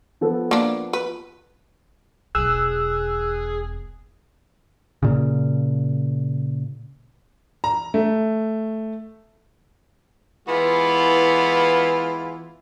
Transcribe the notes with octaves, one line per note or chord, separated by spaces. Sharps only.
F3 B3 A4
A#3 D4
B4
E1 B1 G#4 E6 F#6
A#2 C#3
A#5
A3
E3 G#3 B3 E4 F4